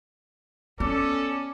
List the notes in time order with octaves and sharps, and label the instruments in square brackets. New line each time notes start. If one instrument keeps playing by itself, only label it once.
[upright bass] B3 [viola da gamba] C#4 [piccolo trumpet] A4 [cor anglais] D5